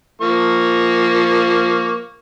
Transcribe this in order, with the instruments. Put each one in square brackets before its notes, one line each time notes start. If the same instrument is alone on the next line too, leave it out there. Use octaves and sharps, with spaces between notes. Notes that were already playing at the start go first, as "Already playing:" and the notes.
[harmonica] F3 A#3 C#6